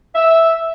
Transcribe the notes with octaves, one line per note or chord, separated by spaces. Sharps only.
E5